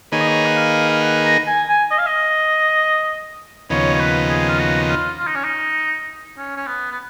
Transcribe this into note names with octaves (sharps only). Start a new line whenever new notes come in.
D#3 A#3 D#4 G#4 B4 C#5
D#5
C#5
F#5
F5
F5
F#5
A#5
G#5
G#5
D#5
F5
D#5
D#2 C#3 F3 B3 D#4 C#5
C#5
B4
G#4
F4
F#4
F4
F4
D#4
C#4
D#4
C#4
C#4
B3
B3